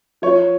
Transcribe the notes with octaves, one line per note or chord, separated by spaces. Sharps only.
F3 C#5